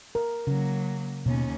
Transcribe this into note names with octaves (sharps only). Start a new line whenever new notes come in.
A#4
C#3 F#3 A#3
D#2 B2 B3 C#4